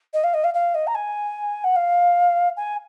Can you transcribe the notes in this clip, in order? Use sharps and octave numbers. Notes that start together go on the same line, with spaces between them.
D#5
F5
D#5
F5
F5
D#5
A#5
G#5
F#5
F5
G#5